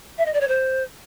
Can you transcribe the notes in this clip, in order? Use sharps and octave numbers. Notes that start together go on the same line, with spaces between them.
E5
D#5
D5
C#5
C5